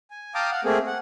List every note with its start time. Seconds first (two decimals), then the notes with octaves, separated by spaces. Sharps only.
0.11 G#5
0.35 F5 G5 A5 A#5 D6 D#6
0.52 F5 F#5
0.65 A3 A#3 C4 G#4
0.87 F#5